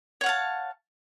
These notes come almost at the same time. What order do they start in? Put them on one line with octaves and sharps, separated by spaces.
C#5 F#5 F5 A5